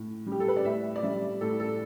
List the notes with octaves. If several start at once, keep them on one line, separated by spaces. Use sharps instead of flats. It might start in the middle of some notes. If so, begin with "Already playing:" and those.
Already playing: A2
G3
G4
A4
B4
D5
A2 E5
D5
G3 E5
A2 A4
A4